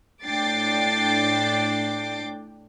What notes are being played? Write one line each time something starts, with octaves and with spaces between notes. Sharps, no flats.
A2 D4 G5 D6 A6 C7